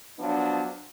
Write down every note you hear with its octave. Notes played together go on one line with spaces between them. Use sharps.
F3 F#3 B3 D4